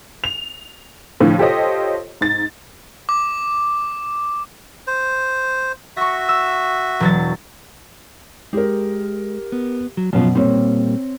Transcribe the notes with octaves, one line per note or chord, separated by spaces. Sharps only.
F7
A2 D3 F3
F4 G4 A4 C5 C#5 D#5
G#2 A6
D6
C5
F#4 E5 C#6 A#6
E6
E1 F#3 A6
G#3 G4 A#4
B3
F#3
F#2 B2 F3 B3 F4
A#2 G3 A#3 C4 C#5